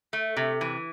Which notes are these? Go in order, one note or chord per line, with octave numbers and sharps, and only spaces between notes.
A3
C3
E3